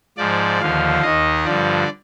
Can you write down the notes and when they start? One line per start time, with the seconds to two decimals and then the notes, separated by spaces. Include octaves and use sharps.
0.17 G#2 F3 D5
0.61 D#2 D3 F3 F5
1.03 D#2 D#3 D#5
1.45 G2 D3 F3 D5